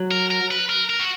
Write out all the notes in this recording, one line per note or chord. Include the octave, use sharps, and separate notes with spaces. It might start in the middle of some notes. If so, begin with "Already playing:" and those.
Already playing: F#3
A#4
A#4
B4
A#4
A#4
F#4